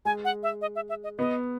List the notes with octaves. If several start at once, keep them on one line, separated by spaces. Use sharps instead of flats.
G#3 G#5
F#5
E5
D#5
E5
E5
D#5
B3 D#5